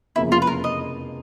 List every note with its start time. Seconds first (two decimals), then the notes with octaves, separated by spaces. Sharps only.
0.16 F1 E2 C#3 F3 A#3 E4
0.32 F4
0.42 B4
0.47 A#4
0.64 D#5